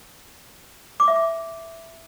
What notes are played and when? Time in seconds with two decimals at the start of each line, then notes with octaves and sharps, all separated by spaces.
1.00 D6
1.08 E5
1.16 D6